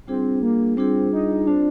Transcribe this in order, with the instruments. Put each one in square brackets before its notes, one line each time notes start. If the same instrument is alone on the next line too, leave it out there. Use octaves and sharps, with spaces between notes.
[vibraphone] G3 D4 F4 G#4 [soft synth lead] C4
[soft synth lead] A#3
[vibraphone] G3 D4 F4 G#4 [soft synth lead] C4
[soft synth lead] D#4
[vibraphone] C4 F4 C5 [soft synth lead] D4